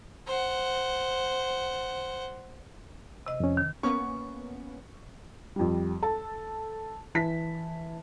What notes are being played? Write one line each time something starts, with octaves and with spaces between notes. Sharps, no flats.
C5 F#5
C3 D#5
F2 C#4
D#3
A#3 B3 C#4 C#6
F2 G3
A4 A5
E3 A5 B6